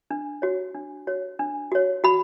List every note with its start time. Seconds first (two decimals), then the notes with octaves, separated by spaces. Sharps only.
0.10 D4
0.42 F#4 C#5
0.74 D4
1.07 F#4 C#5
1.39 D4
1.72 F#4 C#5
2.04 F#4 B5